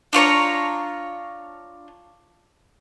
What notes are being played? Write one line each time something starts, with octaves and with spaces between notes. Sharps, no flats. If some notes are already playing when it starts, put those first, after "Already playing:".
D4 F4 C#5 A#5